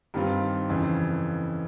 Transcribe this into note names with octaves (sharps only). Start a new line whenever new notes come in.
G2 D#3 G3 C4 F4
F2 C#3 E3